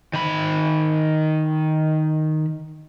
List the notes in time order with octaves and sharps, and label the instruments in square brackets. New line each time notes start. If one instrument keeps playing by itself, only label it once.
[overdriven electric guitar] D#3 B5